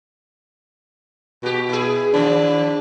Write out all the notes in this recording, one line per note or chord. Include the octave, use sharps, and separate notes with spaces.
B2 F#4 G4
E4 G#4
D#3 F3 D4